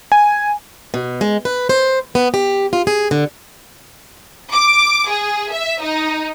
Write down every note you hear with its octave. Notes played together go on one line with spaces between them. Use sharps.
G#5
B2
G#3
B4
C5
B3
G4
F4
G#4
D3
D6
G#4
E5
D#4